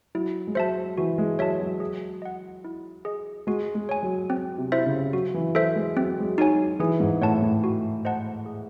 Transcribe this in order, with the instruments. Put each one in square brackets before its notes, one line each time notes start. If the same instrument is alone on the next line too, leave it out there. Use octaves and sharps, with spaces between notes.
[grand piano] F#3 [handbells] E4
[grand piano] G#3
[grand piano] F#3 [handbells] C5 E5 A5
[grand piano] E3 [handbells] F#4
[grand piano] G#3
[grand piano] F#3 [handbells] C#5 E5 A5
[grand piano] F#3
[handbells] G#4
D#5 F#5
E4
G#4 D#5
[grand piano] G#3 [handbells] F#4
[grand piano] G#3
[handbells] C#5 G#5
[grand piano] F#3
[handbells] C4
[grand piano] C3
[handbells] E4 C5 E5
[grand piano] C#3
[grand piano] F#3 [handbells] F#4
[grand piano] E3
[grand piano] F#3 [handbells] A4 C5 E5
[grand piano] G#3
[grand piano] F#3 [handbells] C4
[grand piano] G#3
F#3
[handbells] D#4 F#4 C#5 G#5
[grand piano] F#3
[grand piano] E3 [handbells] G#4
[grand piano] G#2
[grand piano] A2 [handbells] C#5 F#5 A5
[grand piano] A2
[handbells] F#4
C5 D#5 F#5 A5
G#4